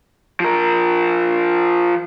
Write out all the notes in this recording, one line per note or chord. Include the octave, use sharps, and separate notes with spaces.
F3 A#4